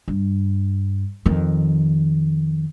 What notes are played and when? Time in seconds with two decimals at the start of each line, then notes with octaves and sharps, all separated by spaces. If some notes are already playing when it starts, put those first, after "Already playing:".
0.08 G2
1.26 F2 D#3